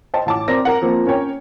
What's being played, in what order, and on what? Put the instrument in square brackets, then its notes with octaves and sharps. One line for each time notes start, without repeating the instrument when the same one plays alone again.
[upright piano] C5 D#5 G5 A5
A1 A5 D6
C4 A#4 D5 A#6
A#4 F#5
F3 A#3 C4
C#4 A#4 C#5 G5